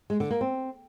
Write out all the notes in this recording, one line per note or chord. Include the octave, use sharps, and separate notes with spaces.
G#3
D3
A#3
C4